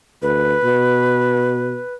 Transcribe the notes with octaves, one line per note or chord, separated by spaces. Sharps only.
D2 B4
B2